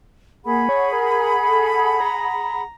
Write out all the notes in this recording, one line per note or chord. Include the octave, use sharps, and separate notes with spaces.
A#3 G#4 F#5 B5
C#5
A#4
A4
A#5